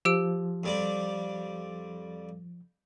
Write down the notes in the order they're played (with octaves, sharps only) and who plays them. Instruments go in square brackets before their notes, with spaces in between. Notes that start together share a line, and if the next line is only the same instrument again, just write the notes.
[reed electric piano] F3 [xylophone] G4 E6 D7
[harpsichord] F2 G3 D5